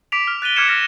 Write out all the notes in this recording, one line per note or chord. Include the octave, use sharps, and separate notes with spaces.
D6 B6 D7 F7
F6
F#6 A6 D#7 G7
D6 F6 F#6 G#6 C#7 E7
F6 A6 A#6